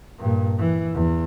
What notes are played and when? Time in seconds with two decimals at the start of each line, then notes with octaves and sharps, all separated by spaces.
0.19 G2 A#2
0.58 E3
0.94 E2